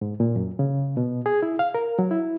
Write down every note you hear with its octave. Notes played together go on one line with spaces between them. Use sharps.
G#2
A#2
F#2
C#3
B2
G#4
E4
F5
A#4
F#3
E4